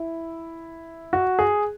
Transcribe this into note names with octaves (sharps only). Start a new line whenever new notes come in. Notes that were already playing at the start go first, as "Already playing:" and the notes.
Already playing: E4
F#4
G#4